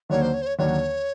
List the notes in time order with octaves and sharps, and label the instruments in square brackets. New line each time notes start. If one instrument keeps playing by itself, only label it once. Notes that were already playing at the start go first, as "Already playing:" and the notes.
[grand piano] D#2 D3 F#3 A#3 [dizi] C#5
[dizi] C5
C#5
C5
C#5
[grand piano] D#2 D3 F#3 A#3 [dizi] C#5